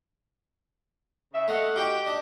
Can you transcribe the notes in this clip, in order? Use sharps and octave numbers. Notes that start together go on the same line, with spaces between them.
C#3 E5
A3 D#5 F5 F#5
D#4 F#4 G4 G5
D4 D#5